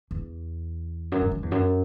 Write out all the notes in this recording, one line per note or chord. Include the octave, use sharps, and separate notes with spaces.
E2
F#2
G#2
F#2
E2
F#2